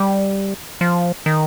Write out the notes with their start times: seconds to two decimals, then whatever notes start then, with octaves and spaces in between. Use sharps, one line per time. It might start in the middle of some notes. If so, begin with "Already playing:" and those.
Already playing: G3
0.81 F3
1.26 D#3